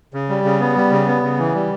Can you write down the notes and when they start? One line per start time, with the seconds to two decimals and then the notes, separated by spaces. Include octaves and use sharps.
0.14 C#3
0.29 G3
0.44 C#3
0.60 B3
0.76 G3
0.92 C#3
1.07 B3
1.23 C#3
1.39 E3
1.55 G3